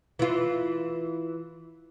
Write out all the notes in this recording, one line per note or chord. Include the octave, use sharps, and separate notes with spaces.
E3 F4